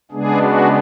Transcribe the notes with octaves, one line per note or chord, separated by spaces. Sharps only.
C#3 G#3 B3 D4 G#4
F#4